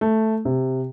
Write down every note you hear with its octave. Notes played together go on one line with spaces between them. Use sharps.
A3
C3